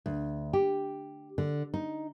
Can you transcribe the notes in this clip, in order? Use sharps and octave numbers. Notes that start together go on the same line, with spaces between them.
D2
G4
D3
D#4